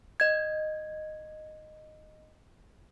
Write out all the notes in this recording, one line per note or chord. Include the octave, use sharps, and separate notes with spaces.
D#5 G#6